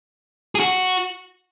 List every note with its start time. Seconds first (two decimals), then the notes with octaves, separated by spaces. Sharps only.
0.55 G#4
0.60 F#4